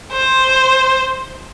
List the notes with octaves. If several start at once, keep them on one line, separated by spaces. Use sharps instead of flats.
C5